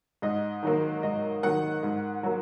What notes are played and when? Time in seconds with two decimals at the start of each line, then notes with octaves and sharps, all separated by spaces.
0.22 G#2 D#5
0.63 D#3 F#3 A#3
1.03 G#2 D#5
1.43 D#3 F#3 A#3 F#5
1.83 G#2
2.23 F#3 A#3